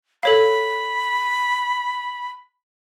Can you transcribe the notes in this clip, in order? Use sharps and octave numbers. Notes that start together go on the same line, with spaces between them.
A4 C#5 F5 B5